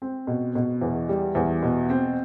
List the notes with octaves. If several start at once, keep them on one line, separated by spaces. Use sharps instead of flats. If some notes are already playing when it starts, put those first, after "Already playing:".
C4
B2
B2
E2
G3
E2
B2
C4